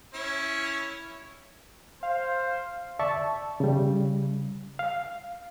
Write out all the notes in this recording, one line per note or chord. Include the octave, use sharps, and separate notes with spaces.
C#4 E4 C#5
C5 F5
D5 E5 A5 C#6
C#3 G3
F5